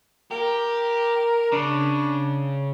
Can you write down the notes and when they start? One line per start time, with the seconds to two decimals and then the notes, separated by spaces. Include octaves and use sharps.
0.31 G4 A#4
1.52 C#3 D4